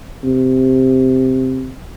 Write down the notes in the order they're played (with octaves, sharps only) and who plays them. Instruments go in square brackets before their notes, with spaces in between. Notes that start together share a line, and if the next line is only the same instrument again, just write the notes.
[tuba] C3